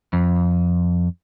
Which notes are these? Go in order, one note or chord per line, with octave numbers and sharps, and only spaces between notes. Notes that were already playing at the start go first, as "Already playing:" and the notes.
F2